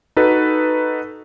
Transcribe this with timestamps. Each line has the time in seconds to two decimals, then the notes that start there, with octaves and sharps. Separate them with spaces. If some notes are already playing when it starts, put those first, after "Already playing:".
0.17 D#4 F#4 A4 B4